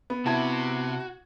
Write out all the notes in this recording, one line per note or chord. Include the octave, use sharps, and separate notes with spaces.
B3
C3 E4 F#4 A5 G#6